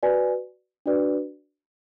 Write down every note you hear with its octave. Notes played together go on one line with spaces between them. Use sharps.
F#4 B4 D5 G#5
D4 F#4 B4 D5